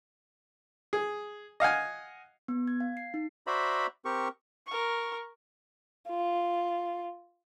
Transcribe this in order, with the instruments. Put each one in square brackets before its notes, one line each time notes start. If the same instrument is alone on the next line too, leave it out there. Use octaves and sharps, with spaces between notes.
[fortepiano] G#4
D#5 F5 F#5 G#5
[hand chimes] B3
G#6
F5
C7
D#4
[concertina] F#4 C5 D5 E5 A#5 B5
C4 G4 A#4 C#6
[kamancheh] A#4 C#6
F4